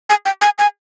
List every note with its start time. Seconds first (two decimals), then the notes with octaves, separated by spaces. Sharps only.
0.09 G#5
0.25 G5
0.41 G#5
0.58 G#5